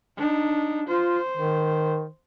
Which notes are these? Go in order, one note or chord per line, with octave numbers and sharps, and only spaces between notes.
D4 D#4
F4 C5
D#3